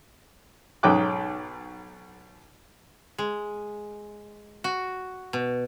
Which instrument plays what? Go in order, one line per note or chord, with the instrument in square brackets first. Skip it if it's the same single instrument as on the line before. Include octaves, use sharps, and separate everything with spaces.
[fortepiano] B1 G#2 C#4 G5 D6 F#6
[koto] G#3
F#4
B2